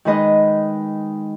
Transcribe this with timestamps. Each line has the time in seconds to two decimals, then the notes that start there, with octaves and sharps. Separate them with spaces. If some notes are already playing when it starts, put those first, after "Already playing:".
0.05 D#3 G#3 D#4 B4 D#5